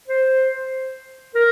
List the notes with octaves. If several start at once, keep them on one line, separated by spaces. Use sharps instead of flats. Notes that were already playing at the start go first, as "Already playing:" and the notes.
C5
A#4